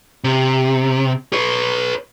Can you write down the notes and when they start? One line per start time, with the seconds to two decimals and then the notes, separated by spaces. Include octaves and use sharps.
0.24 C3
1.33 B4 C#5